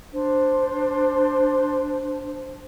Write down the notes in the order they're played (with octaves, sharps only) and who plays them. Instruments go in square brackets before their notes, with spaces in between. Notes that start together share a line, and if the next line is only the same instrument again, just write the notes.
[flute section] D4 C5